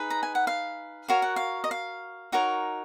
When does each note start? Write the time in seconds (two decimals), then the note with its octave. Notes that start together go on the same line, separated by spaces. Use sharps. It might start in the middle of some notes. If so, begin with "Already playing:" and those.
Already playing: D#4 G#4 B4
0.10 A#5
0.23 G#5
0.35 F#5
0.47 F5
1.08 F#4 A#4 C#5 F5
1.22 F#5
1.36 F5
1.64 D#5
1.71 F5
2.32 D#4 F#4 A#4 C#5